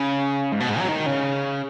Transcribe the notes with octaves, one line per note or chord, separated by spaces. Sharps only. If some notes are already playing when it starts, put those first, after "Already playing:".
Already playing: C#3
G#2
B2
G#2
F#3
D#3
C#3